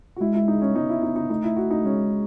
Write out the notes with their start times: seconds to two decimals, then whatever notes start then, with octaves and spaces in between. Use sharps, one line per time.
0.16 F#4
0.20 G#3 E4
0.35 E4
0.48 D#4
0.62 C#4
0.75 B3 D#4
0.90 E4
1.03 D#4
1.16 D#4
1.30 A3 D#4
1.44 E4
1.57 F#4
1.71 D#4
1.84 G#3 C#4